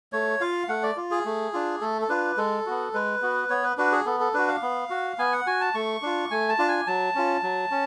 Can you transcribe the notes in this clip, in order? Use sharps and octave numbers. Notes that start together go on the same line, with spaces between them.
A3 C#5
F4 F5
A3 F#5
D5
F4
G#4
A3
D4 F4
A3 A4
A4
D4 F4 B4
G#3 A4
B3 F#4
G#3 B4
B3 F#4
B3 C#5
B4
D4 F#4 B4
G#4
B3 A4
A4
D4 F#4 B4
F5
B3
F#4
B3 G#5
F#5
F#4 G#5
A5
A3 C#6
D4 F4
A3 G#5
A5
D4 F4
G#5
F#3 A5
C#4 F4
F#3
C#4